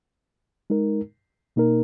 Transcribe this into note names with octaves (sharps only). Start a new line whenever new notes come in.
G#3 D#4 A#4
B2 A#3 D#4 A#4